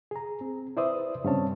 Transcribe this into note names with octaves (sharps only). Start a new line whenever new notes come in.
G#4 A#5
C4
E4 B4 C5 D5 E5 D#6
G2 C#3 C4 C#4 C#5 A5